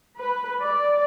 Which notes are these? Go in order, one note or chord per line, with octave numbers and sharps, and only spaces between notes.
B4
D5